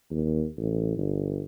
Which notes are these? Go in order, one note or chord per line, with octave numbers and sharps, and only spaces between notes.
D#2
A1
G1